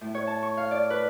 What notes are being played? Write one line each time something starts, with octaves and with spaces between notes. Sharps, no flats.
A2
C#5
A5
C#6
F5
D5
B4